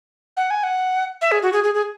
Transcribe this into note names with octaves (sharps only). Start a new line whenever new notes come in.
F#5
G#5
F#5
E5
G#4
F#4
G#4
G#4
G#4